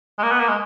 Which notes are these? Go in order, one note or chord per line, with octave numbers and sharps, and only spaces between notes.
G#3
A#3
B3
A#3
G#3